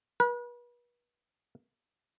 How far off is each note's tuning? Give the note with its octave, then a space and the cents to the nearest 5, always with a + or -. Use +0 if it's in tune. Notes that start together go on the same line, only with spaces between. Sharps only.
B4 -35